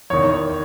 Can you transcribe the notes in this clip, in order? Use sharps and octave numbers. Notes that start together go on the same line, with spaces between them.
E2 D#3 C#5